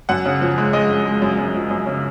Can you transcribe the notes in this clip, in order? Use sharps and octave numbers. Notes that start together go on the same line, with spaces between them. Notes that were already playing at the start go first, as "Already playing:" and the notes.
F#2 F#5
C#3
F3
G#3
G#3 D#5
G#3
G#3
F#2
F#2
F3
F#2
C#3